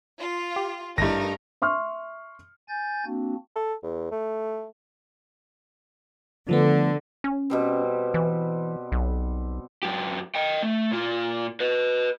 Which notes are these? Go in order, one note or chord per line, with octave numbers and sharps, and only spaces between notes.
F4
G4
G#1 G2 A3 D#4 E4 A#4 A#6
E5 C6 C#6 F6
G#5 G6 A6
A#3 C4 D4 F#4
A4
E2
A3
D3 F3 A3 B3
C#4
B2 G3 C4
E3
B1
F#2 G4
D#5 G5
A3
A#2 F4
B4 D#5